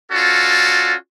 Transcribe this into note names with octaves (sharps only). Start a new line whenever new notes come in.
C#4 F4 F#4 A4 D5